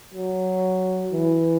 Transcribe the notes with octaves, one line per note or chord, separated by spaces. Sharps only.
F#3
E3